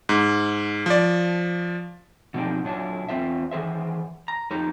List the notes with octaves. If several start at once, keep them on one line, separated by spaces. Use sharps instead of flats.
G#2
F3 D5
B2 F3 C4 D4 D#4 G4
A#2 F#3 D4 E4 A5
E2 C4 F4 C5 E5
D#3 E3 G#4 C5 E5
A#5
F2 A#3 D#4 G4 A#5